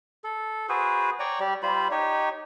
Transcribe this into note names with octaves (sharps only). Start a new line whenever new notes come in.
A4
F#4 G#4 B4 C5
C#5 D5 G5 A#5
G3 G4 D5
G3 F4 C5 B5
D#4 G4 C#5